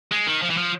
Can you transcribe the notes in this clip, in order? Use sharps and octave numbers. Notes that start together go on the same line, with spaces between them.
G#3
D#3
F3
E3
F3